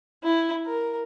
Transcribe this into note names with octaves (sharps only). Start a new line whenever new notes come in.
E4
A#4